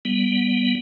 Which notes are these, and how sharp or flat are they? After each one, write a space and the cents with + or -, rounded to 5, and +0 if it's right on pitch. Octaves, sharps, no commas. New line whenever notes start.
G3 +0 B3 -15